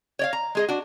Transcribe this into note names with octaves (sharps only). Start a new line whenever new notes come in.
C#5 D5 F5
A#5
G#3 G#4 D#5
D4 F#4